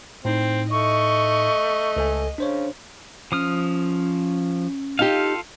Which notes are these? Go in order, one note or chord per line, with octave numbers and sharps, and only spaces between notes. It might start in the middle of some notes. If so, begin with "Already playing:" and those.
A2 C4 D#4
A3 D#5 C#6
C#2 A4 G#5
C#3 D4 C5 C#5
F3 C#4 D#6 F6
D#4 F4 G4 A4 F5